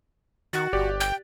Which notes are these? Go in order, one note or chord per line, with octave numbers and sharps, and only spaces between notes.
D#3 F#4 F#6 A6
G1 G4 D5
G5